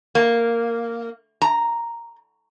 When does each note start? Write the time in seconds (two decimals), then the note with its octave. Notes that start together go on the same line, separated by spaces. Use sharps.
0.15 A#3
1.42 A#5